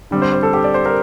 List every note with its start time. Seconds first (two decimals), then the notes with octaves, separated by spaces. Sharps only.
0.11 D3 G3 C4
0.22 C5
0.33 C5
0.43 A4
0.54 G4
0.64 D5
0.74 C5
0.86 A#4